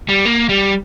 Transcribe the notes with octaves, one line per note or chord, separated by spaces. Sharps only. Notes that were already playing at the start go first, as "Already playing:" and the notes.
G3
A#3
G3